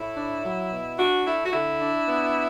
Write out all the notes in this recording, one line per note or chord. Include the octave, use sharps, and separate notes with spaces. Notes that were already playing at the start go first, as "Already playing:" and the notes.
Already playing: A2 E4
D4
F#3
B2
D4 F#4
A3 E4
F#4
D3 E4
D4
B3